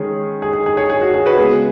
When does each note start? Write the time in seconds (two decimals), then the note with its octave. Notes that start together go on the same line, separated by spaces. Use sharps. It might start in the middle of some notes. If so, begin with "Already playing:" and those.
Already playing: D#3 G#3 C#4 G#4
0.42 G#4
0.53 G#4
0.66 G#4
0.77 G#4 C#5
0.90 G#4
1.02 F#4
1.14 G#4
1.26 F#4 B4
1.37 C#3 G#3 B3 G#4